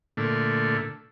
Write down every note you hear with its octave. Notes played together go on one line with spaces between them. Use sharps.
A#2 D3 A3